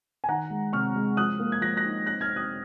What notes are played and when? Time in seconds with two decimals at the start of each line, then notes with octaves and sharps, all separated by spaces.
0.24 G#5
0.28 D#3 F#5 A#5
0.50 G#3
0.73 C3 C#6 F6
0.96 G#3
1.17 F3 D#6 F#6
1.40 A#3
1.52 G#6
1.62 F3 F#6 A#6
1.77 F#6 A#6
1.85 D#4
2.06 C4 F#6 A#6
2.21 F6 G#6
2.29 C4
2.36 D#6 F#6